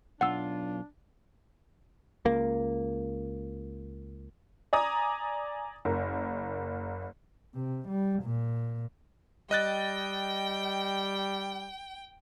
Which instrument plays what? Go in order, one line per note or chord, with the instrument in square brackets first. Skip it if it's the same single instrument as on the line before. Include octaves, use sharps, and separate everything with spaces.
[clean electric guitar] B1 F4 [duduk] D4 [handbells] F#5 E6
[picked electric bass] C#2 A#3
[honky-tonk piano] D5 G#5 A#5 D#6
F#1 A#4
[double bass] C3
G3
A#2
[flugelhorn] G3 [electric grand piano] D#5 F#6 A6 [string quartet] G5